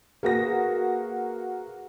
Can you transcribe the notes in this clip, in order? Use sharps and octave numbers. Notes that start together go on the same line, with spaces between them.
A#3 F#4 G#4 B4 A#6